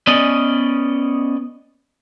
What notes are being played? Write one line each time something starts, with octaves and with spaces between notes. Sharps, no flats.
B3 C#4 D5 D#5